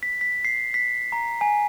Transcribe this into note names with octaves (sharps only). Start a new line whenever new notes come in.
B6
B6
C7
B6
A#5
G#5